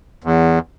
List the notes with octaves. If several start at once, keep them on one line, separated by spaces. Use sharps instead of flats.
E2